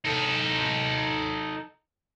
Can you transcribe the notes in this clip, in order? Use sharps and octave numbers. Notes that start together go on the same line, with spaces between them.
D#4 A4